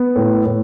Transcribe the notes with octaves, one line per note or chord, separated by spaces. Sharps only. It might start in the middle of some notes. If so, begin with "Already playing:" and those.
Already playing: B3
A2
A2